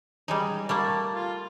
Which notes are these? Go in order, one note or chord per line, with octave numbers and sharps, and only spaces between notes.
G3 G#3 D#4
G3 A3 A#3 A5
F4